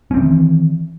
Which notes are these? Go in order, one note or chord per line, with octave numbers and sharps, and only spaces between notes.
D#3 E3 C4 C#4